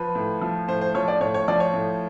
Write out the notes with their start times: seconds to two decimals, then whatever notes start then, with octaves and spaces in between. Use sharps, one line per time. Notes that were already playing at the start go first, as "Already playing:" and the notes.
Already playing: F3 B4
0.15 A2
0.41 F3
0.68 A2 C5
0.81 C5
0.95 F3 C#5
1.08 D5
1.21 A2 C#5
1.34 C#5
1.48 F3 D5
1.60 C#5
1.74 A2